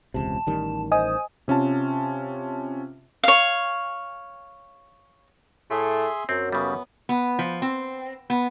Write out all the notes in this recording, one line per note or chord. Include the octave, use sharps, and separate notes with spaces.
E1 C#2 C3 A5
A1 D#3 G3
C5 D#5 G#5 D#6
C3 C#4 F4 A5
C#5 F5
A2 A3 G#4 E5 C6
F#2 C4
C#3 G3 B3
B3
F3
C4
B3